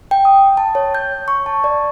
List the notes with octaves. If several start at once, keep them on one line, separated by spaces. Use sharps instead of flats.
G5
D#6
A5
C#5
G6
C#6
A5
D5